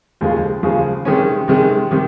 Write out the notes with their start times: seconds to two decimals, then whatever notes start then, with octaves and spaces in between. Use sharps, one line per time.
0.21 D#2 C#3 F3 G#3
0.63 D#2 C#3 F3 G#3
1.05 C3 D#3 G#3 C#4
1.48 C3 D#3 G#3 C#4
1.91 C3 D#3